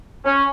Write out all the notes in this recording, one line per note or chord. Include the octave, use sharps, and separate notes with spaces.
C#4